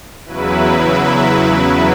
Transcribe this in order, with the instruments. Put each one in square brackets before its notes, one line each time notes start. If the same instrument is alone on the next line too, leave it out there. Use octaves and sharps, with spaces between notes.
[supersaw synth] E2 C#3 F#3 E4 B4